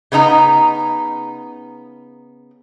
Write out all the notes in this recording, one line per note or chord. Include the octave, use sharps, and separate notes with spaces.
C#3 B3 D#4 A#5